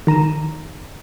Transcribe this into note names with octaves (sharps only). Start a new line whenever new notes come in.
D#3 A#5 D#7 E7